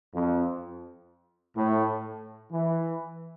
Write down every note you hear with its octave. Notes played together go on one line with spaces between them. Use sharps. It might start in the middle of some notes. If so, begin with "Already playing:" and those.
F2
A2
E3